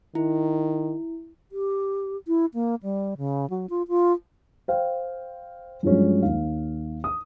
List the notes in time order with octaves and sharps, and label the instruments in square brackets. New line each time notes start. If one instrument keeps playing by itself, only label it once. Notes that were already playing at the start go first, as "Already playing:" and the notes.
[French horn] D#3 [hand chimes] E4
[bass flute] G4
E4
A#3
G3
C#3
F#3
F4
F4
[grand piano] C5 F5 G5
G2 F3 F#3 G#3 C#4
D#2 D#3 F5
D#6